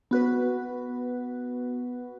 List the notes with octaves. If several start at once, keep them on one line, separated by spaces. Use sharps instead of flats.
B3 F#4 B4